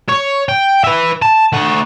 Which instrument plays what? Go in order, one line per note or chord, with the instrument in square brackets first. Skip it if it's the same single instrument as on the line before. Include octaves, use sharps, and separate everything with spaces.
[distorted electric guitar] C#5
G5
B4 E5
A5
A3 F#5